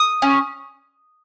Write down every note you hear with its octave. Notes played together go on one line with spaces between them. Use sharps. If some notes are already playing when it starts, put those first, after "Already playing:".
Already playing: D#6
C#4